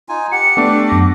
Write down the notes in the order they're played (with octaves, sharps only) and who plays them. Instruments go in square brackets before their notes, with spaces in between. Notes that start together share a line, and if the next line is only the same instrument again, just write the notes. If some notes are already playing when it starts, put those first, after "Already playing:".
[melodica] D#4 F4 G#5
[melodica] G4 F#5 [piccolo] C#7
[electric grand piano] A3 D4 [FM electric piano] B3 [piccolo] D6
[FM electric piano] F#2 A#6 [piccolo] D6